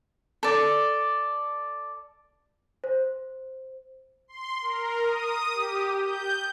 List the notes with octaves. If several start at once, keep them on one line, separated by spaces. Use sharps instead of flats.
A4 D5
C5
C6
A#4
D#6
G4
G6